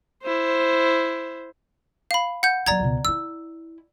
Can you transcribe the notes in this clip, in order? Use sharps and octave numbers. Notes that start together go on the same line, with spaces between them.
E4 C5
F5 B5
F#5 G6
D#3 F#3 D5 A#5 G#6
C#2 B2
D#4 E4 E6